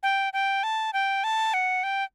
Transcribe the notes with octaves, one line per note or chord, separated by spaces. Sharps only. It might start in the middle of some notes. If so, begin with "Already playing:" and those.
G5
G5
A5
G5
A5
F#5
G5